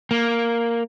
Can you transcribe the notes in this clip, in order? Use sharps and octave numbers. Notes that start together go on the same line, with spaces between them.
A#3